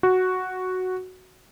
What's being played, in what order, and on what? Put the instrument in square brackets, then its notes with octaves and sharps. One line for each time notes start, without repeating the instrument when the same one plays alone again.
[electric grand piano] F#4